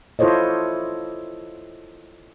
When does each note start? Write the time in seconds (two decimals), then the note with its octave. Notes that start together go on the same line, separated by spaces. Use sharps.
0.19 E4 F4 A4 C5 C#5 D#5